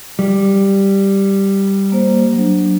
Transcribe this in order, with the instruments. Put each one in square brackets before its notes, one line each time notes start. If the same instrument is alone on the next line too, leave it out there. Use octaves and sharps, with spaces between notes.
[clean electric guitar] G3
[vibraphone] A#3 C5
F#3 D4